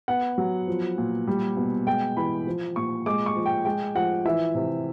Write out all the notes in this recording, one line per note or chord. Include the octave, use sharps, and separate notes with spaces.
B3 F#5
F#3
F3
A#2
G3
B2
G#3 G5
E3 B5
F3
A#2 C#6
G#3 D6
C#6
F3
G5
G#3 G5
F3 F#5
E3 E5
C3